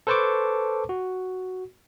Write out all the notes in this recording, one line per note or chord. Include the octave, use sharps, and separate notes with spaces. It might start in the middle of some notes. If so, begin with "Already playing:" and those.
A4 B4 C5 A5 C#6 D6
F#4